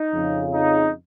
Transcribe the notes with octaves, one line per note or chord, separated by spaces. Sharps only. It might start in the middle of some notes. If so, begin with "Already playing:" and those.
Already playing: D#4
F2 C#3
D#4